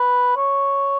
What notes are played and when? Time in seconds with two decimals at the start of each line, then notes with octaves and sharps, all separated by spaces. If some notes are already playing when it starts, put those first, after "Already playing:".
Already playing: B4
0.36 C#5